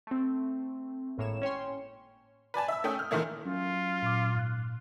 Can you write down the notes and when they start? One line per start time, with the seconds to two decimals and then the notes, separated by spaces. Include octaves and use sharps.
0.07 A3 C4
1.18 G#1 A2 A#3 C#5 E7
1.42 C#4 C#5 G5 C6
2.54 B4 D5 G#5 A5
2.68 E5 E6
2.84 A3 C#4 G5 D#6 G6
2.99 F6
3.11 A#2 D#3 E3 A3 A#3
3.46 F#3 C#4 F4
4.02 A#2 D6
4.35 G#2 F#6